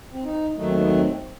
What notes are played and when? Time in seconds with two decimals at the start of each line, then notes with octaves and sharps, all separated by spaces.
0.12 C4
0.24 D#4
0.56 D#2 D#3 F#3 A3 D#4
0.67 C4
0.77 B3
0.87 C4